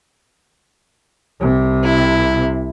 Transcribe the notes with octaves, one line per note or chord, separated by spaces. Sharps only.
C2 C3
E4